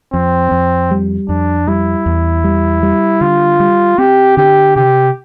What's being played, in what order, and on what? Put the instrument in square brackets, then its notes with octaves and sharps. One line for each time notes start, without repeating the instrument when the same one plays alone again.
[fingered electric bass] F2 [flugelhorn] C4
[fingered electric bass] F2
G3
[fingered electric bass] F2 [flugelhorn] D4
[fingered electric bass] G3 [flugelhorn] E4
[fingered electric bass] E2
G3
G3
[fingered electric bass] D3 [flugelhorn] F4
[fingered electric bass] G3
[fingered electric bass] C4 [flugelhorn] G4
[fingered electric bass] D3 [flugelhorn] G4
[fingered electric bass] C3 [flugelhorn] G4